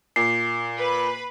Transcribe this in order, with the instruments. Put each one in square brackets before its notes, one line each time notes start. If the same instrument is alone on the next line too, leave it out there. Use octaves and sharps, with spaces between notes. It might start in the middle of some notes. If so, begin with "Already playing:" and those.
[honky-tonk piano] A#2 [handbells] C7
[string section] B4 B5